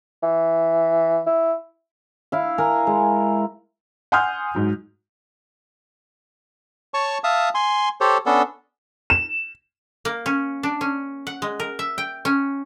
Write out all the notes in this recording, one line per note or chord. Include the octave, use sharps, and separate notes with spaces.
E3
E4
E4 F5
A#4 G#5 A#5
G#3
F#5 G#5 C6 D#6 F6 G6
G#2 F#3
C#5 A5 C#6
E5 F5 A5 D#6
G#5 C6
G4 A4 C5 C#5
B3 C#4 D4 A4
E7
A#3
C#4
D4
C#4
F#5
G#3
A#4
E5
G5
C#4